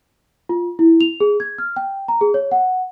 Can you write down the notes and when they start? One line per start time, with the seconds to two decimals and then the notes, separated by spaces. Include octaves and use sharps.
0.49 F4
0.79 E4
1.01 F7
1.20 G#4
1.40 G#6
1.58 F6
1.76 G5
2.08 A#5
2.21 G#4
2.34 C#5
2.52 F#5